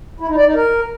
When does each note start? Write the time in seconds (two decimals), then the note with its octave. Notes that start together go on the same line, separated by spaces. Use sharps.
0.20 E4
0.29 D#4
0.37 D5
0.46 D#4
0.55 A#4